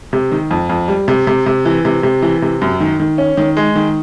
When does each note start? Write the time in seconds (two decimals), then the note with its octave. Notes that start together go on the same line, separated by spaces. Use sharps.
0.13 C3
0.32 D#3
0.51 F2
0.69 F2
0.88 G3
1.08 C3
1.27 C3
1.46 C3
1.65 E3
1.85 C3
2.03 C3
2.22 E3
2.42 C3
2.61 F#2
2.80 D#3
3.00 D#3
3.18 C#4
3.37 D#3
3.57 G#3
3.76 D#3